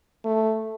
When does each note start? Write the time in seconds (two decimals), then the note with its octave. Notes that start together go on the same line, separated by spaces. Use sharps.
0.24 A3